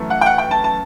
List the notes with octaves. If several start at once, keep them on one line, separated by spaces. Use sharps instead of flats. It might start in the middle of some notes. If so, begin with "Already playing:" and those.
Already playing: F#2 E3 A3
F#5
G5
F#5
G5
A5
A5